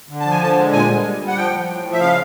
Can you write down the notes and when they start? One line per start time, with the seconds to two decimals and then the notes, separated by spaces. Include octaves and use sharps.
0.09 D3
0.20 A5
0.25 F3
0.31 G#5
0.41 D3 A5
0.57 G#3
0.73 A#2 G#5
0.89 G3
1.04 G3
1.21 G3
1.28 F#5
1.36 F3 G5
1.52 F3
1.69 A2
1.85 F3
1.92 E5
2.00 C#3 F5